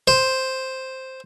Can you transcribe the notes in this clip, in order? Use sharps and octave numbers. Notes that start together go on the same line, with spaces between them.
C5